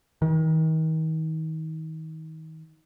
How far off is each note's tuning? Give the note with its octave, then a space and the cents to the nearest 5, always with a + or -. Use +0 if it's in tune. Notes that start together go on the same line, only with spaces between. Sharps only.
D#3 +35